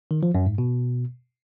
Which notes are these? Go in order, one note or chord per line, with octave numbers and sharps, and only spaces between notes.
D#3
F3
F#2
G#2
B2